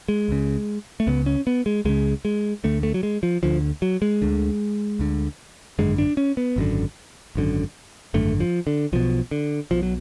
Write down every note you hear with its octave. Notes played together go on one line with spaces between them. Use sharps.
G#3
C#2 C#3
A3
C#2 C#3 B3
C#4
B3
G#3
C#2 C#3 G#3
G#3
D2 D3 A3
A3
F#3
G#3
F3
D2 D3 F3
F#3
G#3
D2 D3
D2 D3
G#1 F#2 D3 G#3
D4
C#4
B3
G#1 F#2 D3
G#1 F#2 D3
G#1 F#2 D3 A3
F3
D3
B1 B2 F3
D3
B1 B2 F3
F#3